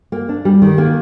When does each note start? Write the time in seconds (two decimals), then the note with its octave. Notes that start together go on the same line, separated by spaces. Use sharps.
0.12 A#3
0.29 D4
0.45 G3
0.62 D#3
0.78 A#3